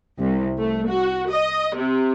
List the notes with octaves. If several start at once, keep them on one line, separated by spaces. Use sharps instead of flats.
C2
A3
F#4
D#5
C3